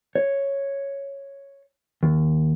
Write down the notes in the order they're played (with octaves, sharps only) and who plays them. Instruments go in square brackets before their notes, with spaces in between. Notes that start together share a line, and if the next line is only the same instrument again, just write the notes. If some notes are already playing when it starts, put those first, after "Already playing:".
[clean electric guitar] C#5
D#2